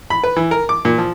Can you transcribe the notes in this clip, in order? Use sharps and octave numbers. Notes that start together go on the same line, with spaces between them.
B5
B4
E3
A#4
D6
A#2
F3